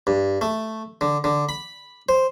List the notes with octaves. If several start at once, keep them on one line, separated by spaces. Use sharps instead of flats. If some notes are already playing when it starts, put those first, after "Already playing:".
G2
A3
D3
D3
B5
C5